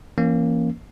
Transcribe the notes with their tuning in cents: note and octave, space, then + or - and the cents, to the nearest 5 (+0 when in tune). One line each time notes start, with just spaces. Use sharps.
E3 +35 A#3 +0 C#4 -20